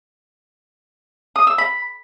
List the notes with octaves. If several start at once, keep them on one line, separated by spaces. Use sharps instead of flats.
D#6
E6
B5